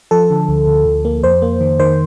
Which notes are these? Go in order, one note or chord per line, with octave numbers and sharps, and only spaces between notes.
F3 A4
D3
D2
D2
D2
A#3
F2 C5
A#3
D#3
D#3 C5